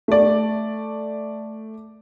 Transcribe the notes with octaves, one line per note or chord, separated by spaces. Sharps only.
A3 D5